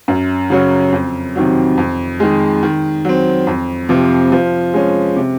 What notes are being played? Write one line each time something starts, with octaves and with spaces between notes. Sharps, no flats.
F#2
C#3 F#3 C#4 F#4
F2
C3 D#3 F#3
F2
D#3 G#3
D#3
F#3 C4
F2
C3 F3
F3
G#3 C#4
C3